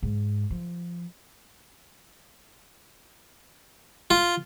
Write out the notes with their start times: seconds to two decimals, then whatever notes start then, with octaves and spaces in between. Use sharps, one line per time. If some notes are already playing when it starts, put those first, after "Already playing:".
0.03 G#2
0.50 F3
4.10 F4